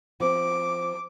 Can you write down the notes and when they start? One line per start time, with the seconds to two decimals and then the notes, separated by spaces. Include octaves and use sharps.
0.20 F3 C4 D6